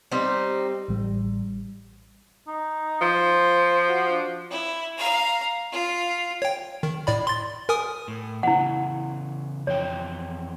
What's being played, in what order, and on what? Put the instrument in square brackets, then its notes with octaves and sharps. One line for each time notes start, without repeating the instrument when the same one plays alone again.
[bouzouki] G3 C4 D#4
[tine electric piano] A1 A2 G3
[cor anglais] D#4
[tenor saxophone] F3 [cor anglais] C5
[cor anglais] F#4
D4
[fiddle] E4
F5 A#5
F4
[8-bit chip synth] C#5 G5
D#3
A2 D5 B5
C6 A6
A#4 G#5 D#6
[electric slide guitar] A2
[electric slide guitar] C#3 E3 [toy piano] E4 F#5
[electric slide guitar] F2 E3 G5 [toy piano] C#5